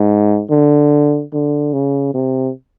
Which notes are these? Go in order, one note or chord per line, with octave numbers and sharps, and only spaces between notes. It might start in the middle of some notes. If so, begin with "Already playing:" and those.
Already playing: G#2
D3
D3
C#3
C3